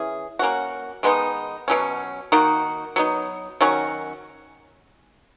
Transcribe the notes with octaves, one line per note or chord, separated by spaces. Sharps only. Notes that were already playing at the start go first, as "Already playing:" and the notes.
Already playing: E3 C#4 G#4
A#3 C#4 F#4
D#3 G#3 B3 D#4
B2 F#3 C#4
D#3 A#3 D#4 F#4
F#3 B3 D#4
D#3 F#3 C#4 F#4